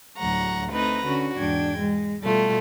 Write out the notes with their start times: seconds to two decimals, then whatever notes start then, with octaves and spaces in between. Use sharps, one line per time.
0.18 D2 A2 F#3 F#5 A#5 C#6
0.72 A3 C4 D#4 B4 A#5
1.06 D3 C#4 F#4
1.39 E2 G#2 D4 G5 G#6
1.78 G#3
2.21 B2 G3 A3 F4